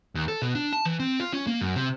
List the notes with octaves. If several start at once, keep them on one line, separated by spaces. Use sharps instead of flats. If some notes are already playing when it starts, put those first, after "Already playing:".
D#2
A4
B2
D4
A5
E3
C4
F4
C#4
A#3
F#2
C3